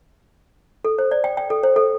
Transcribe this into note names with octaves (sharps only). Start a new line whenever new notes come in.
A4
C5
D5
G5
G5
A4
C5
A4